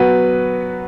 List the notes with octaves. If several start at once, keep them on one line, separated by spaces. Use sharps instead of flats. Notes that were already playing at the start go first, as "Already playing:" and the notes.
Already playing: F#3 B3 F#4 B4